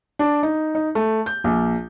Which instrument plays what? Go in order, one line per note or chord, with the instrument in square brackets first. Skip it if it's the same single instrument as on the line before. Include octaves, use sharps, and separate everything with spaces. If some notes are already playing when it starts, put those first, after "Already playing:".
[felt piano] D4
D#4
D#4
A3
G6
A#1